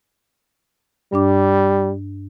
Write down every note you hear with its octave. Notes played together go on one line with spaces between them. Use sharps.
G2 G3 D4 D6